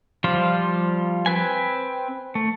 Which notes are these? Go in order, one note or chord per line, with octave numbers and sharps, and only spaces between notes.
F3 G3 F4 C5
C4 B4 G#5
A3